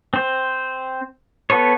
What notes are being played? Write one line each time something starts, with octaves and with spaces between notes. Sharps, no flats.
C4 C5
B3 A4 B4 C#5